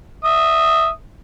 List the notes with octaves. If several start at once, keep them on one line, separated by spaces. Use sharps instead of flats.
E5 D#6